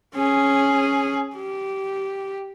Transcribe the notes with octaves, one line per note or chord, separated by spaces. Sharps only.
C#4 G#4
G4